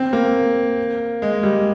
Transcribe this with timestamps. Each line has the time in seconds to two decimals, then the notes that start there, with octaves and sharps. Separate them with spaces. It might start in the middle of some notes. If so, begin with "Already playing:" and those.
Already playing: C4
0.13 A#3
1.22 G#3
1.43 G3